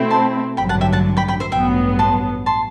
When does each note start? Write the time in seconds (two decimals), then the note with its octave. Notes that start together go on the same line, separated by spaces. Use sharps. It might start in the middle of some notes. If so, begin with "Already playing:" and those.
Already playing: B2 A3 C4 E4
0.10 A5 C6
0.57 A1 G2 D3 F#3 G5 B5
0.69 F#5 A5
0.81 E5 G5
0.93 F#5 A5
1.17 G5 B5
1.28 G5 B5
1.40 C5 E5
1.52 A1 G2 F#3 B3 E5 G5
1.99 A5 C6
2.46 A5 C6